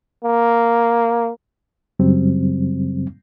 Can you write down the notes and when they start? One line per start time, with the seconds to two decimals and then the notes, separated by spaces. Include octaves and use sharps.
0.24 A#3
1.99 F#2 C#3 F#3 G3 C4